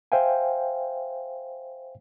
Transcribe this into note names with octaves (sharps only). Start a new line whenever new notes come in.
C5 E5 F5 G5 G#5